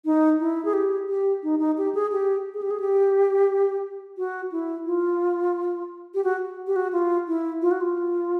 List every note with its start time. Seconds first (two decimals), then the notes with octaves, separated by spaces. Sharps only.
0.05 D#4
0.40 E4
0.65 G#4
0.73 G4
1.09 G4
1.43 D#4
1.59 D#4
1.78 G4
1.95 G#4
2.12 G4
2.54 G#4
2.62 G4
2.71 G#4
2.80 G4
4.18 F#4
4.52 E4
4.86 F4
6.14 G4
6.24 F#4
6.67 G4
6.76 F#4
6.93 F4
7.27 E4
7.62 F4
7.71 F#4
7.81 F4